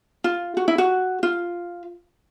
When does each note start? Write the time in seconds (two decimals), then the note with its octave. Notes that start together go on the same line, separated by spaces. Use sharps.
0.24 F4
0.57 F#4
0.68 E4
0.78 F#4
1.23 F4